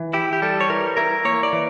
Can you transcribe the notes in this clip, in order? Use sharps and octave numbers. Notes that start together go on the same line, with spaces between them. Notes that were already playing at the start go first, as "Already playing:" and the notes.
Already playing: E3
E4 G4
G4
G3 A4
C#5
E3 A#4
E4 A#4
A#3 C#5
D5
E3